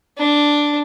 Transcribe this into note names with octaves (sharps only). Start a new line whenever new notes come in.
D4